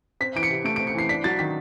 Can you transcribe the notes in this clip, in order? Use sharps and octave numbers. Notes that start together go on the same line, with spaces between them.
C4 B6
E3 D7
C#7
C3
A3 D7
C4 D7
C#7
E3 C7
D4 B6
F#3 A6
D#3 B6